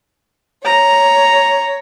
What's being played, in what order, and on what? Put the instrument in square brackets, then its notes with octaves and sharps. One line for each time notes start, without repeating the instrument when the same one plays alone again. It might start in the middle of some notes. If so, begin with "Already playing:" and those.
[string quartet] C#5 [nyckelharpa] A#5